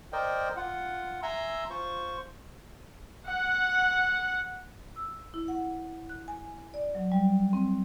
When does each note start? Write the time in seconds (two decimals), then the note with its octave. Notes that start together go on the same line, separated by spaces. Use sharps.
0.13 A#4 C5 D5 D#5 G5
0.56 F4 F#5
1.23 E5 G#5 A#5 C6 E6
1.70 F4 C5 C#6
3.30 F#5
4.96 E6
5.34 E4
5.48 F#5
6.09 F#6
6.28 G#5
6.74 D5
6.95 F#3
7.12 G3
7.53 C4